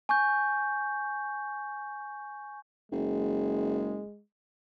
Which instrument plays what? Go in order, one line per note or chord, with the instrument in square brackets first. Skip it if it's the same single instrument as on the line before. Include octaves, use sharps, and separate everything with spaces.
[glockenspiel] G#5 C#6 G6
[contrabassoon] F#1 [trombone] G#3